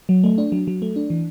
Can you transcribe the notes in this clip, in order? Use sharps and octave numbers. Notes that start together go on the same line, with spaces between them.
F#3
A3
D4
F#3
F#3
A3
D4
E3